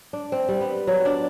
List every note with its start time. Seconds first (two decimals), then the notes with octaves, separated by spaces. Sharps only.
0.13 D4
0.32 C4
0.48 G3
0.61 B3
0.87 F#3
1.05 D4